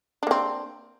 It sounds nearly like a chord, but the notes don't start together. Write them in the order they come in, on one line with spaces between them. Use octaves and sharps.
D4 A#3 C4